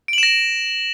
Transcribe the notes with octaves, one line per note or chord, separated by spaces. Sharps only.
A#6 D7 E7 F#7